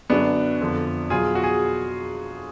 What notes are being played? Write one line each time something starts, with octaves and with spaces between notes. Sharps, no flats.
F#2 D3 F#3 B3 D4
F2 D3 F3
B2 F#3 F4 G#4
F#4
G#4